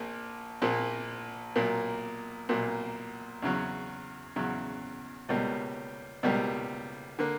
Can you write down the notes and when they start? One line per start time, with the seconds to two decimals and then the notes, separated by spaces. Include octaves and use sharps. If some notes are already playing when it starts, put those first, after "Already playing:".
Already playing: A#1 A#2 A#3
0.62 A#1 A#2 A#3
1.56 B1 A#2 A#3
2.49 B1 A#2 A#3
3.42 E2 C#3 F#3 C#4
4.36 E2 C#3 F#3 C#4
5.29 C#2 B2 G3 A#3
6.23 C#2 B2 G3 A#3
7.19 D3 A#3